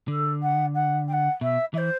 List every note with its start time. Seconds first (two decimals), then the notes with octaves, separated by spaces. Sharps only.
0.08 D3 A4
0.42 F#5
0.74 F#5
1.08 G5
1.12 F#5
1.41 B2 E5
1.74 E3 E5
1.77 C5